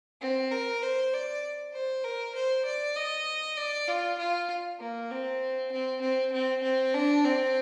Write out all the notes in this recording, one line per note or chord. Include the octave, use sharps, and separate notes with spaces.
C4
A#4
C5
D5
C5
A#4
C5
D5
D#5
D5
F4
F4
A#3
C4
C4
C4
C4
C4
D4
C4